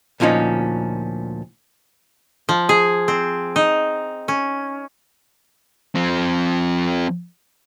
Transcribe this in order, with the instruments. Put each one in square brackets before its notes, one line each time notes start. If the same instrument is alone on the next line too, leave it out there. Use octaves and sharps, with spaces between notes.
[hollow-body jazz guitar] D2 A#2 F3 C#4 D#4
[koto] F3
G#4
C4
D#4
C#4
[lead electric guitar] F3 C4